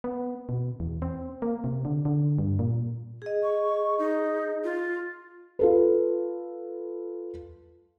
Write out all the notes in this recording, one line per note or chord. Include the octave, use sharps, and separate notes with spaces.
B3
B2
E2
C4
A#3
C3
D3
D3
G2
A#2
G#4 D#5
C#6
D#4
F4
F4 A4 B4